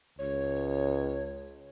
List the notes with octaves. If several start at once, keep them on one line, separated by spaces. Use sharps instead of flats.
C#2 C#5